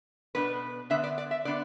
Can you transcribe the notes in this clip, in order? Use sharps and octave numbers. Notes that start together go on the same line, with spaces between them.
B2 B3 D4 B4
D3 B3 D4 E5
D5
D5
E5
D3 B3 D4 D5